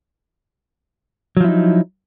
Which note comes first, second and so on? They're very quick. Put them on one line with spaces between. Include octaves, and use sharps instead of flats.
F#3 F3 E4 D#4